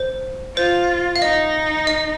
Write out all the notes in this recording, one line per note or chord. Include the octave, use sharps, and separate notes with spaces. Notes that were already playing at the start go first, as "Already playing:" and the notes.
Already playing: C5
F4 C5
F5
D#4 D#5
D#5